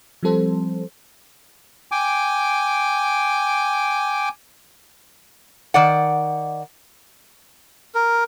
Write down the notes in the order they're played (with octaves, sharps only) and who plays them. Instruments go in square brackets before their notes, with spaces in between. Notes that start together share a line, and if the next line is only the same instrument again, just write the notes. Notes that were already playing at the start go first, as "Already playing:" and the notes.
[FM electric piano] F3 G3 C4 A4 C5
[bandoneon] G5 G#5 D6
[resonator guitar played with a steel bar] D#3 D5 F#5
[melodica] A#4